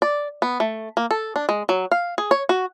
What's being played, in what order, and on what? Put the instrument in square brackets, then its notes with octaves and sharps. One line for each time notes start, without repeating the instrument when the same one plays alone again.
[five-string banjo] D5
B3
A3
A#3
A4
D4
G#3
F#3
F5
G#4
C#5
F#4